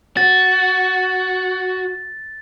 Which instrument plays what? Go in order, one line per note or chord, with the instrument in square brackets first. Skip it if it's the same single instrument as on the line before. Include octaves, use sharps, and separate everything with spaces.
[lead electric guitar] F#4 [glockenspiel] A6